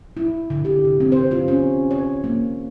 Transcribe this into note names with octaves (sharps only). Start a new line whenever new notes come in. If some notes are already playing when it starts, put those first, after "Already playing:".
E4
D3
G4
C3
C4
C5
F4
C#4
C#5
A#3